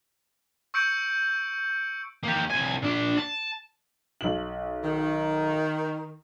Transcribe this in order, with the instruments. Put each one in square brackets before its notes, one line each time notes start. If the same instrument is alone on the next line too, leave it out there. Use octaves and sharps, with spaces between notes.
[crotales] C#6 E6 G6 C#7 D7
[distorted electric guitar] A#3 G4
C2 G#5
A#2 D4
A5
[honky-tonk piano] B1 F#7
[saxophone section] D#3